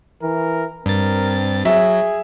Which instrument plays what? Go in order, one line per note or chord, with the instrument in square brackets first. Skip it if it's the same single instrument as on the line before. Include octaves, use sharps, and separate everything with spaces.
[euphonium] E3 [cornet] A#4
[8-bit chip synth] G2 A6 [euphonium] C4 [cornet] A#4
[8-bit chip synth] F#3 [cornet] G#4 [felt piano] E5